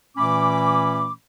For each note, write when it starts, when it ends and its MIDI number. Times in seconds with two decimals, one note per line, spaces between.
0.17 1.11 46
0.17 1.11 52
0.17 1.11 57
0.17 1.11 61
0.17 1.11 83
0.17 1.11 86